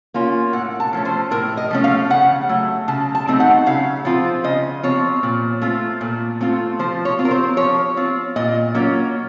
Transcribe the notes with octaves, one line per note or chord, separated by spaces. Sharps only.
A#3 C#4 F4
A2 F#5
A5
F3 A3 C#4
C5
A2 A#4
D#5
F3 A3 C#4
F5
C#3 F#5
F#3 A3
C#3 A5
A5
F#3 A3 C4 D#4
F#5
C#3 F5
F3 C4 F4
C#3 D#5
F3 C4 F4 C#5
A#2
A3 C4 F4
A#2
A3 C4 F4
F3 C5
C#5
C4 F4
A#4
C5
F3 C#5
C4 F4
A#2 D#5
F#3 A#3 C#4 F4